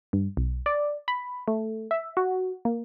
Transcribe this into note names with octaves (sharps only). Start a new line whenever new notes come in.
G2
B1
D5
B5
A3
E5
F#4
A#3